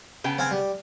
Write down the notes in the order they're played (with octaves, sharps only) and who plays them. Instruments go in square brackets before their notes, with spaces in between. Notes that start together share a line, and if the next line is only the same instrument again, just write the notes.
[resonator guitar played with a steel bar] C#3 B3 G5
[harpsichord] C4 F5 G#5
G3